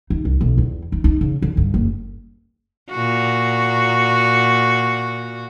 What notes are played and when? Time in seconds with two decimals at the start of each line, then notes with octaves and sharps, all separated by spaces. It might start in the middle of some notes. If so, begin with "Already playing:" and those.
0.10 D#4
0.25 C2
0.41 B1
0.58 E2
0.92 D#4
1.04 D#4
1.21 C#3
1.42 D3
1.57 G2
1.74 F#1
2.90 A#2 F#4